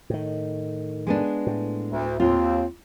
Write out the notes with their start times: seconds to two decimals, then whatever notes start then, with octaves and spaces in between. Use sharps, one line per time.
0.10 A2 D#3
1.07 G#3 B3 D4
1.47 A2
1.90 D2
2.20 D#2 C4 F4